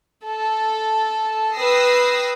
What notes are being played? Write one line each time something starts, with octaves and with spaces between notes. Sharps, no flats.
A4
B4 G5 D#6 E6 A#6 C7